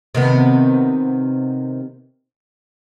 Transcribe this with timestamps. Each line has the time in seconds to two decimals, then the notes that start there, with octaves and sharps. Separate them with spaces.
0.15 C3 D#3 B3